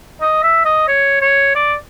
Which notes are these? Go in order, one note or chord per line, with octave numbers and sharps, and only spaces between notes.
D#5
E5
D#5
C#5
C#5
D5